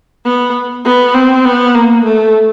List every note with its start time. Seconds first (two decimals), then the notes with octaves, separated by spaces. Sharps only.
0.25 B3
0.85 B3
1.14 C4
1.45 B3
1.74 A#3
2.04 A3